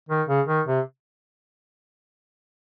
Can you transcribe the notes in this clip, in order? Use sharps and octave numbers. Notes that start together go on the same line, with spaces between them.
D#3
C#3
D#3
C3